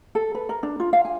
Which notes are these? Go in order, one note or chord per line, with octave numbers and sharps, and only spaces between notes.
A4
B4
A#4
D4
F4
F5
G#5